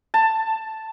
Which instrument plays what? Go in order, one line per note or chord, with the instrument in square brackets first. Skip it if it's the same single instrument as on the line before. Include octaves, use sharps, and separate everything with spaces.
[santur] A5